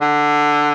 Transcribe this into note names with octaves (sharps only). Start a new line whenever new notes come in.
D3